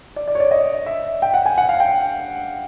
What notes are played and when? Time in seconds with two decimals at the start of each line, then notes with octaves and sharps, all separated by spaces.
0.16 D5
0.27 D5
0.35 C#5
0.40 D5
0.51 D#5
0.86 E5
1.22 G5
1.34 F#5
1.46 G#5
1.58 F#5
1.69 F5
1.80 G5